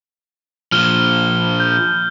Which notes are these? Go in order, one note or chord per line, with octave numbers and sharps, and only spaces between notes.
A#2 F3 F6 G7
G6